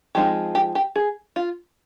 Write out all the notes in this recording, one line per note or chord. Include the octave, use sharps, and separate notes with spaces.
F3 G#3 C4 D#4 G4
G4
G4
G#4
F4